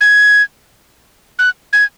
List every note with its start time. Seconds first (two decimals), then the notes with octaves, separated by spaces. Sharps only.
0.01 G#6
1.39 F#6
1.73 G#6